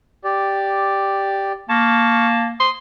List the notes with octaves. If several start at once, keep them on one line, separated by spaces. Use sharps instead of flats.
G4 D5
A#3 F5 A5 C#6
C6 D#6